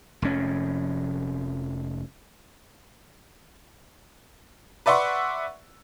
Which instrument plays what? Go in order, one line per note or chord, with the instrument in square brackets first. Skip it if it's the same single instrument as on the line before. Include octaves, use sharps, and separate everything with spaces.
[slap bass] F1 F2 C#4
[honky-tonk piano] B4 D5 E5 F#5 C6 C#6